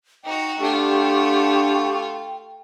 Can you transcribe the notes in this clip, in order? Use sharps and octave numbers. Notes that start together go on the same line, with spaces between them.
D#4 F#4 G5
A3 D4 F4 G4 F#5 C#6